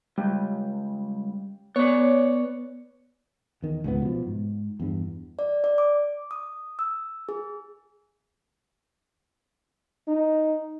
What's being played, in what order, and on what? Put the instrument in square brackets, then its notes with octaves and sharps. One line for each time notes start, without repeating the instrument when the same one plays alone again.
[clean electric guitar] C#2 [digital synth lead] G3
[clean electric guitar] B3 D5 [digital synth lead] C#5
[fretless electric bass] E2 D#3
C#2 G#2 F#3 B3
B2 F3
G#2
E2 G2
[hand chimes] D5
D5
D6
D#6
E6
G#4
[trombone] D#4